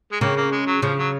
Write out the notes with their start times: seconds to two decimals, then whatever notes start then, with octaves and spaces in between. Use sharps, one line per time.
0.12 G#3
0.21 C#3 A#3
0.37 A#3
0.52 G#3
0.67 F#3
0.82 C#3 F3
0.98 F#3